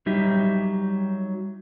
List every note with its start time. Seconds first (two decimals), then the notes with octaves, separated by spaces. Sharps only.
0.06 F#3 G3 D#4 G4 E5